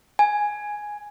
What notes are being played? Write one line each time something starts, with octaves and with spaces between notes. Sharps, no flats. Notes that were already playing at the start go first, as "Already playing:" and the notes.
G#5